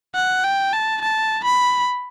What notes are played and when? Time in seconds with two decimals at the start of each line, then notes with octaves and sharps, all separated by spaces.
0.15 F#5
0.44 G5
0.73 A5
1.01 A5
1.44 B5